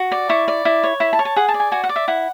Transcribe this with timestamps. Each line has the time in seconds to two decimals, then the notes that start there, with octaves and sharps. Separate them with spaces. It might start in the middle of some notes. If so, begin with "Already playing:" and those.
Already playing: F#4
0.12 D5
0.29 E4 C#6
0.48 D5
0.65 E4
0.83 C#5
1.00 E4 B5
1.13 A5
1.19 C#5
1.25 A5
1.36 G#4 F#5
1.48 A5
1.54 D5
1.60 G#5
1.72 F#4 G#5
1.84 F#5
1.89 D5
1.96 E5
2.08 E4 F#5